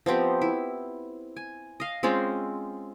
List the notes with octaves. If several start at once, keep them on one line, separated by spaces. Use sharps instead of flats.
F3 B3 C4 G4
E4
G#5
D#5 F5
G#3 C4 C#4 F4